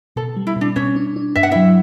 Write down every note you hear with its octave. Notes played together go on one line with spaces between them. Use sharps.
B2 A4
G3
E4
B2 D4
B2 C#4 C#5
D4
D4
G2 E5
F#5
F#3 E4 E5